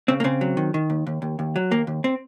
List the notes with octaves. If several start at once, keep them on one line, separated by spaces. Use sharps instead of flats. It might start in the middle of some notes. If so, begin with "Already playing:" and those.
C#3 C4
A#3
C#3 C4
F#3
D#3
D#3
D#2
D#2
D#2
D#2
F#3
D#2 A#3
D#2
C4